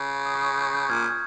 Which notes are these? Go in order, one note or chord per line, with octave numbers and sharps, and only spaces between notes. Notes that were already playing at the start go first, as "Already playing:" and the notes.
Already playing: C#3
D#6
C#6
D#6
G6
G6
A#2 F6 G#6